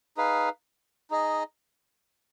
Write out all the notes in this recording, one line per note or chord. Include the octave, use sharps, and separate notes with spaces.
D#4 G#4 B4 F5
D#4 G#4 D#5